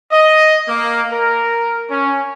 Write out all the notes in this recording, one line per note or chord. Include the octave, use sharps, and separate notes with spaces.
D#5
A#3
A#4
C#4